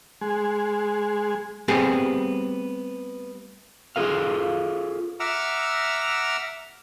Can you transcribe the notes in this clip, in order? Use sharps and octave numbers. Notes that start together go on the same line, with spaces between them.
G#3
G3 A3 B3 C4 G4 G#4
F4 G#4 A4 F5
E5 F#5 A#5 D6 E6 F6